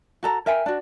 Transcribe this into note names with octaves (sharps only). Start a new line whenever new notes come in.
F#4 A4 A#5
A#4 E5 G5 G#5
D4 F#4